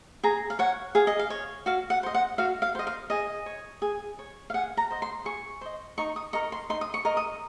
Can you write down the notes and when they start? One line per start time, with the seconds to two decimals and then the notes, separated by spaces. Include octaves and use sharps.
0.24 G#4 A#5
0.50 F5
0.59 C#5 F#5
0.95 G#4 F5
1.07 D#5
1.19 F5
1.30 C#5
1.66 F#4 F5
1.90 F#5
2.03 C5 D#5
2.14 F#5
2.38 F#4 F5
2.62 F5
2.75 C5 D#5
2.87 F5
3.10 G#4 D#5
3.46 C#5
3.82 G#4
4.19 C#5
4.50 F5
4.54 G#4 F#5
4.77 A#5
4.91 C5 D#5
5.02 C6
5.25 G#4 C#6
5.61 C5 D#5
5.98 D#4 C#6
6.16 D#6
6.33 A#4 D#5 C#6
6.52 C6
6.70 D#4 C6
6.81 D#6
6.94 C#6
7.05 A#4 D#5
7.17 D#6